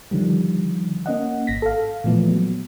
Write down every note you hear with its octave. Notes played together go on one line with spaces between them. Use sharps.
D3 D#3 F3 G3
A#3 C#4 D#5 F#5
G#1 A#6 B6
A4 F5
A#2 E3 F3 A3 B3
F#3